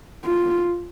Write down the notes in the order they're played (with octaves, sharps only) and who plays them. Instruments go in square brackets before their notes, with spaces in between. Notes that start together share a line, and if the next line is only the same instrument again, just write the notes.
[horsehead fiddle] F4